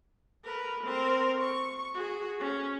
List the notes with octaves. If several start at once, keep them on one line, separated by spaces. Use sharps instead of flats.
A#4 B4
C4 A#4
C#6
F#4 G#4
C#4